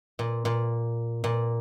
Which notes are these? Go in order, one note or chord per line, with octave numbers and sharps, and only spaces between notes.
A#2
A#2
A#2